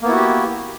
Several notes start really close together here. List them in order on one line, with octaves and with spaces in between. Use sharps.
A#3 B3 E4 F#4 G4